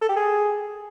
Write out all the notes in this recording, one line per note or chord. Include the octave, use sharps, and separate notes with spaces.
A4
G4
G#4